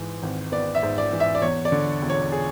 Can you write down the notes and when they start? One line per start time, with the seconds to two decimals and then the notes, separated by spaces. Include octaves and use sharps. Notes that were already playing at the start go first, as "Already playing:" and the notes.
Already playing: G#2 E3
0.23 G#1
0.52 B3 D5
0.75 E5
0.83 G#2
0.98 D5
1.13 E3
1.20 E5
1.35 D5
1.42 E2 C#5
1.65 D5
1.72 D3
2.02 E1
2.10 C#5
2.32 G#4